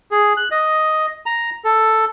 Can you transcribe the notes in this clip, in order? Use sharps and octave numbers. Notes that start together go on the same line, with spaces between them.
G#4
F#6
D#5
A#5
A4